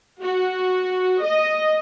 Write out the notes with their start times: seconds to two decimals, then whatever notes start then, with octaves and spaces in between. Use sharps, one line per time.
0.22 F#4
1.25 D#5